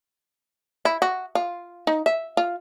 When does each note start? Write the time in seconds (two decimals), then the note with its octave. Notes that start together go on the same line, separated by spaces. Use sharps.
0.85 E4
1.02 F#4
1.35 F4
1.87 D#4
2.06 E5
2.37 F4